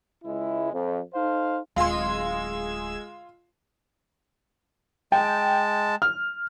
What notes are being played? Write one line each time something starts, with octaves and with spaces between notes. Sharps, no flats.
C#2 G#3 E4
F2
D#4 A4 C5 F5
D1 G#3 F4 C6 E6 G#6
G#3 G5 A5
F6